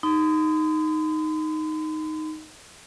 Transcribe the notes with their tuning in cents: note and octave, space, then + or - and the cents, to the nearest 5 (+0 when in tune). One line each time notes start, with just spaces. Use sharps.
D#4 +0 C6 -45